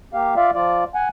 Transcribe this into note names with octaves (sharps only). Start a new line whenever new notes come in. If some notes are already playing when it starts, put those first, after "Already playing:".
A#3 G4 F5
F4 D5 E5 F5
F3 F4 D5
F#5 G#5